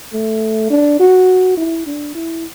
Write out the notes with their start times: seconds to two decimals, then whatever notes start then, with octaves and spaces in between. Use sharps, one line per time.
0.13 A3
0.70 D4
1.00 F#4
1.57 E4
1.86 D4
2.15 E4